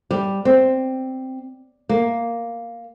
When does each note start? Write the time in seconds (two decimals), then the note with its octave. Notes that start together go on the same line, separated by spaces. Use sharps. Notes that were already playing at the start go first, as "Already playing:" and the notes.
0.11 G3
0.45 C4
1.89 A#3